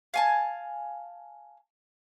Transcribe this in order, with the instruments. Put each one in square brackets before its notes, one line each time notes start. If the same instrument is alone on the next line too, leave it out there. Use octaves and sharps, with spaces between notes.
[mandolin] F5 G#5 A5